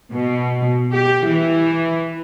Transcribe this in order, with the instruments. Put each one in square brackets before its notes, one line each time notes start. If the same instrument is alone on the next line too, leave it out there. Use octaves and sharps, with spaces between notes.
[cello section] B2
G4
E3